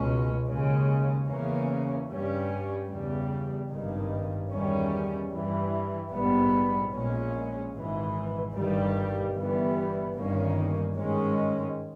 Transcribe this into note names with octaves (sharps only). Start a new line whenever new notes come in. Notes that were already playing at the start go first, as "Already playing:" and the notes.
Already playing: C#2 B2 G#3 C#4
D#2 C#3 G#3 C#4
E2 C#3 E3 A#3 C#4
G2 G3 C#4
E2 C#3 G3
G#1 G2 D#3
E2 D#3 G3 C#4
G2 E3 G3
A#1 G#2 G3 B3
A#1 A#2 G#3 C#4
G#1 G#2 E3
G1 G2 D#3 G3
G1 G2 E3 G3 B3
G1 G2 D#3 A#3 C#4
G#2 D#3 G#3 C#4